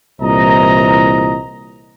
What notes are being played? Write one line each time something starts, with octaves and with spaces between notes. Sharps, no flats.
C2 A#2 E3 C5 D#5 A#5